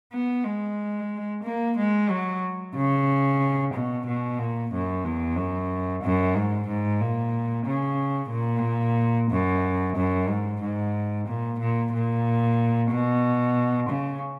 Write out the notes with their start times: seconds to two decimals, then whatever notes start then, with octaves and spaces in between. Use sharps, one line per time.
0.13 B3
0.45 G#3
1.43 A#3
1.77 G#3
2.09 F#3
2.75 C#3
3.74 B2
4.06 B2
4.39 A#2
4.72 F#2
5.04 E2
5.37 F#2
6.03 F#2
6.36 G#2
6.68 G#2
7.00 A#2
7.67 C#3
8.31 A#2
9.31 F#2
9.96 F#2
10.29 G#2
10.62 G#2
11.28 A#2
11.59 A#2
11.93 A#2
12.91 B2
13.89 C#3